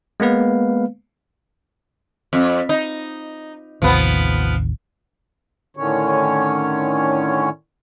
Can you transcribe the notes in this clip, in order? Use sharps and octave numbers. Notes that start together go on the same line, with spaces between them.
G#3 A#3 B3 B4 F5
F2
D#4
A1 D#2 C3 F3 B3
A2 D3 D#3 C#4 C#5